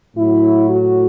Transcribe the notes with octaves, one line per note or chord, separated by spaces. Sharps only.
A2 F#3 E4
F#4